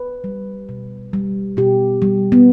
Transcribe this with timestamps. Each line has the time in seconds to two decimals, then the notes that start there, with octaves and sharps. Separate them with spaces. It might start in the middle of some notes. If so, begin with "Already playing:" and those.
Already playing: B4
0.24 G3
0.69 B2
1.13 G3
1.57 B2 G4
2.02 G3
2.32 B3